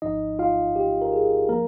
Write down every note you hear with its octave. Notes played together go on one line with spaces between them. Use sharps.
G#1 G#2 F3 D#4 D#5
F4 F5
G4
A#4
G#4
F3 A#3 A#4